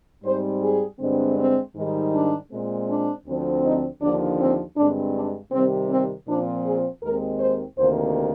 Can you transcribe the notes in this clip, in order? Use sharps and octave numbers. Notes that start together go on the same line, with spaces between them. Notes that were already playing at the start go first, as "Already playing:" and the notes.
G#2 G3 C4 C5
G#4
G2 D3 G#3 C4
C4
G#2 D#3 G3
D4
A#2 G#3 C4
D4
D2 D3 F3 C4
D#4
D#2 D3 F3 A#3 D4
C4
G2 D3 G#3 C4 D4
D4
C3 D#3 G3 C4
C4
A#2 F3 C4 D4
G#4
D#2 D#3 G#3 C4 A#4
C5
D2 C3 D#3 A#3 C5